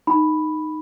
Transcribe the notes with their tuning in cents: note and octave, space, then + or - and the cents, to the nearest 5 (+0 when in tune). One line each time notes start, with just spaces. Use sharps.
D#4 -10 B5 +0